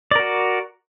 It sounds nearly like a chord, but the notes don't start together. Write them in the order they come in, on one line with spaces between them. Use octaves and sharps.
D5 A#4 F#4